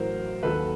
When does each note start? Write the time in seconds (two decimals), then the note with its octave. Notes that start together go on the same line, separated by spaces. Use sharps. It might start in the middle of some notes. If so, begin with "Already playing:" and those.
Already playing: A1 A2 F#3 A#4 C5
0.43 D#2 D#3 F#3 A4 B4